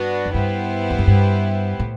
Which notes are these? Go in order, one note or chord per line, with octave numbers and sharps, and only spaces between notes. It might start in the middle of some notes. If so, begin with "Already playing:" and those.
Already playing: G2 B3 D4 F#4
F#2
G2 B3 E4 G4 C5
E2
F#2
G2
A2